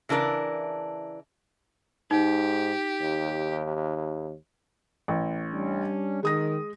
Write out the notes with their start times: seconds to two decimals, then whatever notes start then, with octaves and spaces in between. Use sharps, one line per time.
0.09 C#3 E3 D4 A#4 D5
2.11 G#2 D#4 G4
3.01 D#2
5.08 A1
5.53 G3 C#4 D4
6.23 D#3 G#3 D#6 A#6